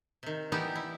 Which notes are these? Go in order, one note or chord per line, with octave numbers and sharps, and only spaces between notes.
C3 D#3
E3 G3 B3 D#4 E4 G4
E4